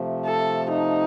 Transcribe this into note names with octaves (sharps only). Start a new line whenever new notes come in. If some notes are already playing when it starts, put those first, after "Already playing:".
Already playing: C3 F3 A3
A4
D#4